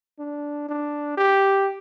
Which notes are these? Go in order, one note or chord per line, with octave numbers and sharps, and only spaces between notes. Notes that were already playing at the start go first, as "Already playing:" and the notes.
D4
D4
G4